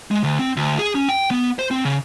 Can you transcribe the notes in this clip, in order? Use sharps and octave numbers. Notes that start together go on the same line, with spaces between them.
G#3
D2
C4
D2
G#4
C#4
G5
B3
C5
C4
C#3